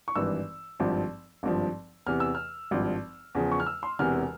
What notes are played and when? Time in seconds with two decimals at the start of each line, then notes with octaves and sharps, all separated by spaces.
0.08 C#6
0.15 G#1 G2 E3 E6
0.80 G#1 G2 F3
1.43 G#1 G2 F3
2.06 E2 C3 E3 F6
2.20 E6
2.35 F6
2.71 G#1 G2 F3
3.35 E2 C#3 F3
3.52 C#6
3.60 F6
3.66 E6
3.83 C6
3.99 E1 E2 C3 E3 F6